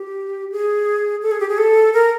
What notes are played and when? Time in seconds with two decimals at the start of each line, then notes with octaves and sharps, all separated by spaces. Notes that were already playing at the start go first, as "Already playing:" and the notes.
Already playing: G4
0.52 G#4
1.22 A4
1.31 G#4
1.40 G4
1.49 G#4
1.58 A4
1.93 A#4